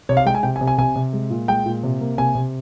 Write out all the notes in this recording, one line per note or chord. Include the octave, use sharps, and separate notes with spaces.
C3 C#5
F5
G#3 G5
G#5
C3 G5
G#5
C3
G#5
C3 G#5
C3
G#3
A#2
G#3 G5
A#2
C3
A#3
C3 G#5
C3